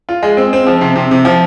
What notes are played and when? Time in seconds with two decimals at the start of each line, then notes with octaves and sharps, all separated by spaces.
0.09 F4
0.22 G#3
0.37 C4
0.53 C4
0.67 F3
0.81 C3
0.96 C3
1.11 C3
1.25 F3